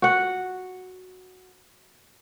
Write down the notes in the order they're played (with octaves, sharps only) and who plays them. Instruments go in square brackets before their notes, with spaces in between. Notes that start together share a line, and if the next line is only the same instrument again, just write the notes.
[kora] F#4 F#5